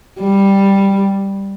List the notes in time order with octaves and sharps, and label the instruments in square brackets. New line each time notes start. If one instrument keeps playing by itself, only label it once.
[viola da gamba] G3